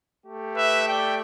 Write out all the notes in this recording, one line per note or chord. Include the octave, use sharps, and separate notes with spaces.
A3 G4
B4 E5
D5 G5